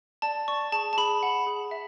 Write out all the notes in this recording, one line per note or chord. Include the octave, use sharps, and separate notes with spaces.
D5 A5
D5 C#6
G#4 A5
A5
G#4 B5
F#5
G#4
E5